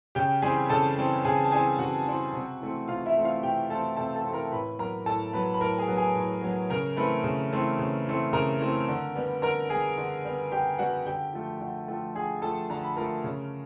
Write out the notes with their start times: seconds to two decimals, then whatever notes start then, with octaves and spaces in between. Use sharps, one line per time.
0.15 C#3 G4 G5
0.42 E3 G3 C4 G#4 G#5
0.69 C#3 A4 A5
0.98 E3 G3 C4
1.25 C#3 G#4 G#5
1.45 A5
1.52 E3 G3 C4 G#4 G#5
1.79 C#3 F#4 F#5
2.06 E3 G3 C4
2.33 C3
2.60 E3 A3 C4
2.88 C3 F4 F5
3.06 E4 E5
3.16 E3 A3 C4
3.24 F4 F5
3.43 C3 G4 G5
3.70 E3 A3 C4 A4 A5
3.97 C3 A4 A5
4.15 A4 A5
4.24 E3 A3 C4
4.33 A#4 A#5
4.52 A2 B4 B5
4.78 F#3 B3 A#4 A#5
5.06 A2 A4 A5
5.33 F#3 B3 B4 B5
5.54 B5
5.60 A2 A#4 A#5
5.78 G#4 G#5
5.87 F#3 B3
5.97 G#4 G#5
6.15 A2
6.42 F#3 B3
6.70 C#3 A#4 A#5
6.97 E3 A3 C4 B4 B5
7.24 C#3
7.52 E3 A3 C4
7.79 C#3
8.06 E3 A3 C4
8.33 C#3 A#4 A#5
8.61 E3 A3 C4
8.88 D3
9.15 G3 B3
9.42 D3 A#4 A#5
9.70 G3 B3 G#4 G#5
9.98 D3
10.25 G3 B3
10.52 D3 G4 G5
10.79 G3 B3 F#4 F#5
11.06 D3 G4 G5
11.33 F3 A3
11.61 D3
11.88 F3 A3
12.15 D3 G#4 G#5
12.42 F3 A3 A4 A5
12.70 D3 A#5
12.83 B5
12.97 F3 A3 A#4 A#5
13.24 C#3